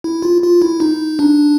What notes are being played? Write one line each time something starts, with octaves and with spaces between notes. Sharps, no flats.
E4
F4
F4
E4
D#4
D4